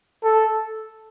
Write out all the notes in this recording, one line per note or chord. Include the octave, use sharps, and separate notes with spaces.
A4